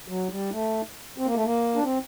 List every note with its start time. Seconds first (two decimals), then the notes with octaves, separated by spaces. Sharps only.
0.08 F#3
0.30 G3
0.52 A3
1.18 C4
1.26 A#3
1.35 A3
1.44 A#3
1.75 D4
1.83 C4